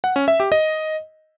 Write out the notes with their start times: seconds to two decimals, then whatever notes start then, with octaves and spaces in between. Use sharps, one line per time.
0.04 F#5
0.16 C#4
0.28 E5
0.40 G4
0.52 D#5